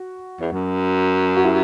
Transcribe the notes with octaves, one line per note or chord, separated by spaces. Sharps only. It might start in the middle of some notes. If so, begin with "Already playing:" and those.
Already playing: F#4
E2
F#2
F#4
E4 G4